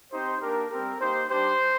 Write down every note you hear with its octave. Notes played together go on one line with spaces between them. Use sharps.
C4 D#4 G4 C5
A#3 D4 G4 A#4
G3 C4 G4 A#4
A#3 D#4 G4 C5
G3 D4 G4 C5